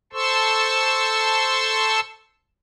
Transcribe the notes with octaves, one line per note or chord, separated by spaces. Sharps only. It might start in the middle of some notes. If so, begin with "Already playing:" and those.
A4 C5 A5 C6 C#6 E6